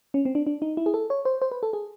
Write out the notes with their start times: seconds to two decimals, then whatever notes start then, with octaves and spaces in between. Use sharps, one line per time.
0.14 C#4
0.25 C4
0.35 D4
0.47 D4
0.62 D#4
0.77 E4
0.86 G#4
0.94 A4
1.10 C#5
1.25 C5
1.42 C5
1.51 B4
1.63 A4
1.73 G#4